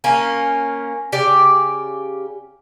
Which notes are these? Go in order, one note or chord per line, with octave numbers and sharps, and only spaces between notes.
A#3 C#4 F4
C#3 G4 D5